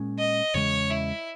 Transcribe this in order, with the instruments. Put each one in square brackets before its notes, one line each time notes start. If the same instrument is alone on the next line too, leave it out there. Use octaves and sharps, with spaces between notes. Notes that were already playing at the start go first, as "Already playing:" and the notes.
Already playing: [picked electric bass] A#2 G#3 C#4
[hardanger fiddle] D#5
[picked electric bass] E2 C#3 G#3 [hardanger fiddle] C#5
[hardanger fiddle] E4